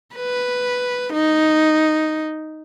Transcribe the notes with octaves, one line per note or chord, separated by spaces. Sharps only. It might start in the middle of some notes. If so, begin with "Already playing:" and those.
B4
D#4